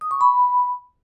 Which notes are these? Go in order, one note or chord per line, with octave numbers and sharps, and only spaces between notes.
D#6
C#6
B5